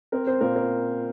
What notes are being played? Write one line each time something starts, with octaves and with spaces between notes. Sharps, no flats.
C4 A#4
C4 C5
A#2 A#4
A#4